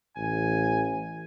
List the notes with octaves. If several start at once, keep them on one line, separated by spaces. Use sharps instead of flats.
A1 G#5